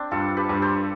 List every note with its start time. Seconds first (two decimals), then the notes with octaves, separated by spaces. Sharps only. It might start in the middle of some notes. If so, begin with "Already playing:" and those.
Already playing: C4 D4 G4
0.11 G2 F4 A4
0.37 G4 B4
0.49 G2
0.62 A4 C5